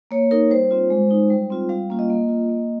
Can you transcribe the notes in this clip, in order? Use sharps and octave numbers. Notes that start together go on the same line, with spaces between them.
A#3 C#5
D#4 A#4
G3 C5
C4 F4
G#3
D#4
G3
C4 F4
G3 F5
A#3 C#4 F4
D#5
A#3
F4
A#3